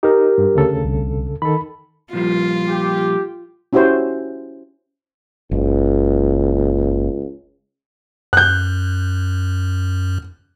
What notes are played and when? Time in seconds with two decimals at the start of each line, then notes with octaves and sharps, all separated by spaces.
0.03 D#4 G4 A#4
0.38 G2
0.55 D2 C#3 A4
0.84 C2
1.42 D#3 A4 B5
2.13 A#2 F3 G3 F4
2.69 G4
3.73 C#4 E4 F#4 G4 C5
5.51 F#1 C#2
8.33 F#2 F#6 G6